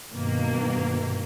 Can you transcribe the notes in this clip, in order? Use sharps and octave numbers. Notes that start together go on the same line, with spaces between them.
G2 B2 D#3 A#3